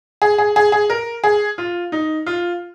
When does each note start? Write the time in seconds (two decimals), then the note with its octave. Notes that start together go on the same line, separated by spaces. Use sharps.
0.22 G#4
0.38 G#4
0.56 G#4
0.72 G#4
0.90 A#4
1.24 G#4
1.58 F4
1.92 D#4
2.26 F4